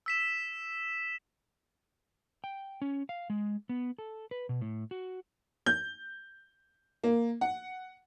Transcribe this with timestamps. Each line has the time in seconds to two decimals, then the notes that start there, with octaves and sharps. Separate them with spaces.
0.06 E6 B6 E7
2.44 G5
2.82 C#4
3.09 F5
3.30 G#3
3.69 B3
3.98 A4
4.31 B4
4.49 B2
4.61 A2
4.91 F#4
5.66 G6
7.04 A#3
7.41 F#5